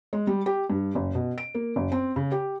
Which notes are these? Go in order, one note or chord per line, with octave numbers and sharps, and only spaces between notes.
G#3
G3
G4
G2
F#1
B2
D7
A#3
F#1
C4
C#3
G4